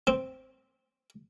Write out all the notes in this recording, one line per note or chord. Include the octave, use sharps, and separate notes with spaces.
C4